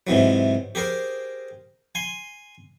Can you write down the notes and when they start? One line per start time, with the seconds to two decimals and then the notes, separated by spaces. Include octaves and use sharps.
0.07 G#2 C3 E3 F#3
0.75 G4 G#4 A#4 C5
1.95 G#5 C6